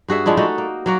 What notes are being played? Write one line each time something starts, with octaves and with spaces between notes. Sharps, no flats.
G2 F#4 G#4 E5
F3 G#3 D4 E4
A3 D#4 F#4 A4
A#3
F#3 A#3 F#4